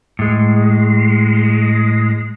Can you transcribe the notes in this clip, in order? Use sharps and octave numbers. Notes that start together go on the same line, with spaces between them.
A2 G#3